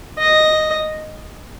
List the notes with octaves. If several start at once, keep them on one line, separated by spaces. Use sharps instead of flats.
D#5